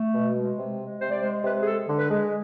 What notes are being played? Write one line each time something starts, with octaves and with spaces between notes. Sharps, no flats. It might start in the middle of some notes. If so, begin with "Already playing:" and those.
Already playing: A3
B2
G#3
C3
G#3
C3 C5
D5
G#3 C5
C3 B4
G#4
G#3 A4
D3
B4
G#3